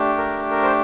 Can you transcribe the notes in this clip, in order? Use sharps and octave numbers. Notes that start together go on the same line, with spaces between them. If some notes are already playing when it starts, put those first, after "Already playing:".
Already playing: A3 D4 G4
A#4
A#4
C5